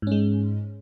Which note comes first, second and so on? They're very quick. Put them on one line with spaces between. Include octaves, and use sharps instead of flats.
G#2 C#4 G#3